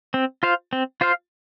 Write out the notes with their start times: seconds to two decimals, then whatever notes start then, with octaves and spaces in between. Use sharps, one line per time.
0.14 C4
0.43 F4 C5 F5
0.73 C4
1.01 F4 C5 F5